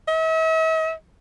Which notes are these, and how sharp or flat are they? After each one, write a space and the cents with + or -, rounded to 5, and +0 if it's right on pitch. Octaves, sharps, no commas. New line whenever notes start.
E5 -45